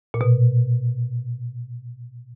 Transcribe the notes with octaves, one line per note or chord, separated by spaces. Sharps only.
A#2
B2